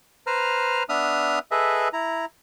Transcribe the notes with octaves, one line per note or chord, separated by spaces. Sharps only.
B4 C5 A#5 F6
B3 D4 E5 D#6 F6
G#4 A4 B4 D#5 E5
E4 A#5